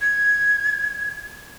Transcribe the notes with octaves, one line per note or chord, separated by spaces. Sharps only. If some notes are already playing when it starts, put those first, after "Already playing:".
G#6